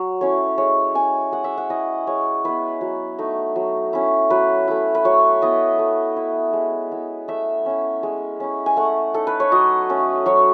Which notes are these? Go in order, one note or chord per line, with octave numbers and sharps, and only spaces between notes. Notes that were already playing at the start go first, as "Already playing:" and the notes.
Already playing: F#3
A3 C#4 E4 C#5
G#3 C#5
C#4 E4 G#5
G#3 F#5
E5
F#5
C#4 E4 D#5
G#3 C#5
B3 E4 B4
F#3
A3 D#4
F#3
C#4 E4
F#3 B4
A3 E4
B4
F#3 C#5
B3 E4 D#5
A3
E4
G#3
B3 E4
A3 E5
C#4 E4
G#3
C#4 E4
G#5
A3 F#5
D#4 A4
B4
C#5
F#3 D#5
A3 C#4
F#3 C#5